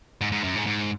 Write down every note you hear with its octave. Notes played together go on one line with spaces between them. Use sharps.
G#2
G#2
F#2
G#2
G#2